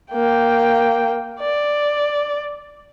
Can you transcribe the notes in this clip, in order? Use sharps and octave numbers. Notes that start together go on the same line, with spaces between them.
A#3 G5
D5